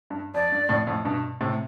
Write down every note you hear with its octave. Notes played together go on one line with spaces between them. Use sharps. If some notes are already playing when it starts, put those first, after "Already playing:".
G2
F2 D5
G2
F2 A2
F2 A2
G2 B2
A2 C3